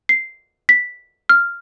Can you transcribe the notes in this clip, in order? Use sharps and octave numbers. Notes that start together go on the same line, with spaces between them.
C7
B6
F6